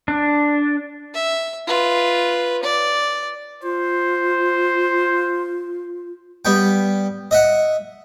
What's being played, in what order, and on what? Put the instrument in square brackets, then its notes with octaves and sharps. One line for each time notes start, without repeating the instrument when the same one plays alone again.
[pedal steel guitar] D4
[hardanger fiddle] E5
F4 B4
D5
[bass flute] F4 [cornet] C5
[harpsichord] G3 B3 G5
D#5 E5 F#5